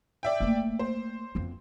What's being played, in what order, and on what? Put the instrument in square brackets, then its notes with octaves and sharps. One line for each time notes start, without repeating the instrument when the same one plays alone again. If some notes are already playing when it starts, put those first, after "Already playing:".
[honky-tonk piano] D5 E5 G5
[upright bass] A3 A#3
[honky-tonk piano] C5
[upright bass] F2 B3